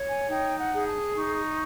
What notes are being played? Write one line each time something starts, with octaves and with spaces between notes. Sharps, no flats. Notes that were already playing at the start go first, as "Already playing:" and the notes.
Already playing: C#5
G#5
D#4 G5
F#5
G#4
A5
D#4 C#6